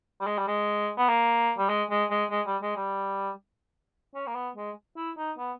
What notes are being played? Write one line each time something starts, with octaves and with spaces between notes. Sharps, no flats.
G3
G#3
G3
G#3
B3
A#3
G3
G#3
G#3
G#3
G#3
G3
G#3
G3
C#4
A#3
B3
G#3
E4
D#4
B3